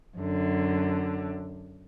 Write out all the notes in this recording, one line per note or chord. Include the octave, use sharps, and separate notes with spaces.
F#2 D3